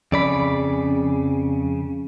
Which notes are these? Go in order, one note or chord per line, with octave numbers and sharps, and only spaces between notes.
F2 C#3 D5 B5